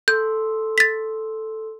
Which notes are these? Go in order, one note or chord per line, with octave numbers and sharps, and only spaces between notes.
A4 C6 E6 G6
A6 B6